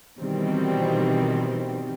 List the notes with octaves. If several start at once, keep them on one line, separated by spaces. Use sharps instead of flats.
B2 D#3 E3 G3 C4